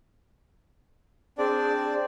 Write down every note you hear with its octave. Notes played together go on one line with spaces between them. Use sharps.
C4 D4 G#4 D5